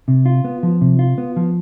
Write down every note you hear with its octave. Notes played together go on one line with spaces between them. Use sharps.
C3
F4
B3
F3
C3
F4
B3
F3